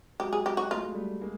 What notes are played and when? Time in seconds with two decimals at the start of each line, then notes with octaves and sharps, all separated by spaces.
0.20 F#3 G#3 G4
0.33 G#4
0.46 G4
0.57 F#4
0.71 A3 F4
0.83 G#3
0.94 G3 A3
1.21 G#3 A#3